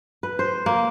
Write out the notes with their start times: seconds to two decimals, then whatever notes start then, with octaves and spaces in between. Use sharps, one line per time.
0.23 B4
0.39 C5
0.66 A#3